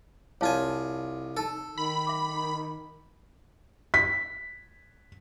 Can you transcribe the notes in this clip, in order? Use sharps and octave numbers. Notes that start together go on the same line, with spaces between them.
C2 F4 C#5 F5 G#5 A5
D#4 A4 A5 E6
D#3 B5
E5 D6
B6